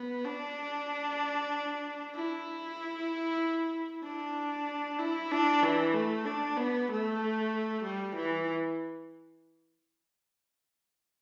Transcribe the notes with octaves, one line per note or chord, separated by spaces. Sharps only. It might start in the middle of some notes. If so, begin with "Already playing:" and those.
Already playing: B3
D4
E4
D4
E4
D4
E3
A3
D4
B3
A3
G3
E3